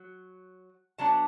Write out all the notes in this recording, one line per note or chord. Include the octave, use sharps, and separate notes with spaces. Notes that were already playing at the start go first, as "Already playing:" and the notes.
Already playing: F#3
F#3 B3 D4 A5